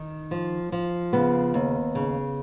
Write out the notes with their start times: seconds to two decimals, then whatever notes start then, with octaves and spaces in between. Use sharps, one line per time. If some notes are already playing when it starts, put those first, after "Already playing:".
Already playing: D#3
0.31 F3
0.72 F3
1.13 C#3 B3
1.54 D#2
1.95 C#3